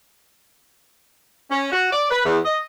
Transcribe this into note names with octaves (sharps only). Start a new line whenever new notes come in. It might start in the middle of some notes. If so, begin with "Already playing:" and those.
C#4
F#4
D5
B4
E2
D#5